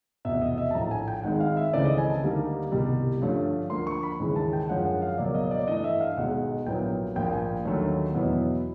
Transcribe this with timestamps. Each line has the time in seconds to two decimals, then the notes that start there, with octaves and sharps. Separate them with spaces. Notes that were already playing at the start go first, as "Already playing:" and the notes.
0.25 F1 E2 B2 E5
0.42 D#5
0.58 E5
0.71 A5
0.75 A#1 A2 F3 A#5
0.91 G#5
1.08 G5
1.23 G#1 G#2 D#3 G#3 F#5
1.40 F5
1.57 E5
1.73 C#2 C#3 E3 A3 C4 D5
1.85 D#5
1.98 G#5
2.10 A5
2.22 D2 D3 G3 A#3 D#4
2.72 C2 B2 G3
3.22 G2 D3 F3 A3 C#4
3.70 D2 D3 F3 A#3 C6
3.87 C#6
4.03 B5
4.20 D#2 C#3 E3 G#3
4.36 A5
4.53 G5
4.69 F#2 D3 F3 G#3 C#4 F#5
4.86 F#5
5.02 F5
5.18 C#2 B2 F#3 A#3 D5
5.35 D#5
5.51 D5
5.68 G2 E3 A3 D4 D#5
5.84 E5
6.01 F5
6.18 B1 B2 G#3 F#5
6.66 A#1 A#2 F#3 B3 E4 G5
7.16 A#1 A#2 F3 A#3 G5
7.27 G5
7.32 G#5
7.65 D#2 D3 F#3 A3
8.14 E2 B2 F#3 B3 E4